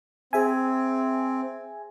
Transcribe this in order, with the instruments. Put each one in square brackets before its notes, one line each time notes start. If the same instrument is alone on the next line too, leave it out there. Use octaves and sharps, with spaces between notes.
[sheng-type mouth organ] C4 [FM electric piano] G#4 E5 G#5